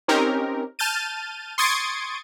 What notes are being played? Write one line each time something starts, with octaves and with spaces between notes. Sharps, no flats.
C4 C#4 D#4 G4 A#4
A5 F6 G6 A6 D#7
C6 C#6 D#6 G#6 A6 D7